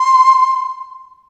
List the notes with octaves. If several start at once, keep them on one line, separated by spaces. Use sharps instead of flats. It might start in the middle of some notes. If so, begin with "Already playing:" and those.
Already playing: C6